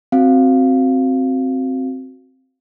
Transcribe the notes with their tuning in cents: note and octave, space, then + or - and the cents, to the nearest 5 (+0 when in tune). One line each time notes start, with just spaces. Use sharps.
C4 +0 F#4 +0 F5 +0